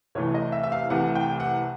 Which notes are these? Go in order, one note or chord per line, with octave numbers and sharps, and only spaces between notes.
C2 C3 E3 A3 C#5
D#5
E5
E5
F5
C2 C3 E3 A3 F#5
G5
F#5